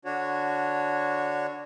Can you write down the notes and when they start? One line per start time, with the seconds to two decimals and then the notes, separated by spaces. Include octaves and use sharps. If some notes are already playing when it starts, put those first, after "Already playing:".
0.05 D3 D4 F#4 C#5